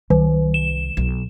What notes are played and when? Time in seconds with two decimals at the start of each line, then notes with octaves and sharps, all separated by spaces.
0.10 C2 D#3
0.54 E7
0.97 B1